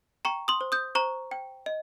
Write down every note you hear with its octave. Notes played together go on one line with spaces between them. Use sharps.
G5 A#5 C#6
C6 D#6
C5
D#6 G6
C5 A#5 C#6
G5
D#5